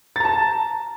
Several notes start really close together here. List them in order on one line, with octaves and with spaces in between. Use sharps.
A6 A#5 A5